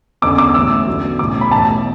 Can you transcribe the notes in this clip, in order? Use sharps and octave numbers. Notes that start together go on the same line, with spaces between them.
F#1 E2 D3 D6
D6
A1 A2 E3 E6
E2 D3 F#3
B1 A2 E3 D6
B5
B1 A2 E3 A5